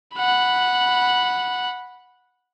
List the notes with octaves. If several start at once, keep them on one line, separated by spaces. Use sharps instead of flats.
F#5 B5